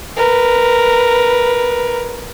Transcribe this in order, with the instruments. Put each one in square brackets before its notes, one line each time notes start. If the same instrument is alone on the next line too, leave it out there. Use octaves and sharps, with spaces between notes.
[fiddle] A#4 B4